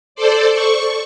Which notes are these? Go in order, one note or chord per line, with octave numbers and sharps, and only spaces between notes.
A4 C5 D5
C#6